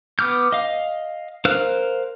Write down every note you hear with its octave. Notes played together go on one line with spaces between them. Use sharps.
B3 D6 F6 G6
D#5 F5
A#4 C5 F5 F6 F#6